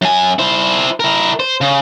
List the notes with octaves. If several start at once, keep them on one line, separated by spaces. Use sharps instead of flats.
F#2 G#5
E4 C5
E4 A#4
C5
C#3